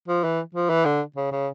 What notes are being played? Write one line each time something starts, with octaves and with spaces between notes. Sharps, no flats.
F3
E3
F3
E3
D3
C#3
C#3